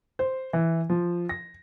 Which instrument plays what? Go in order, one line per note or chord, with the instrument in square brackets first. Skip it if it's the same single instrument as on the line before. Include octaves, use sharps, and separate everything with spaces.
[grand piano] C5
E3
F3
A#6